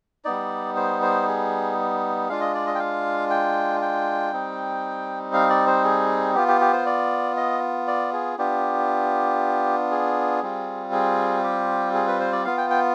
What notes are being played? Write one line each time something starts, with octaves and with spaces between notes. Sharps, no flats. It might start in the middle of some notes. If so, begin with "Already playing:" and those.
G3 B3 D#4 D5
C5
C5
G#4
G#3 D4 F4 F5
D#5
D5
D#5
G5
F5
G5
G5
G3 C4 D#4
F5
D5
C5
G#4
B3 F4 G4
G4
G4
C5
D5
D#5
D5
G#4
B3 D4 F4 G4
G#4
G3 C4 F4
G#4
G4
G#4
B4
C5
D5
B3 F4 F5
G5
G5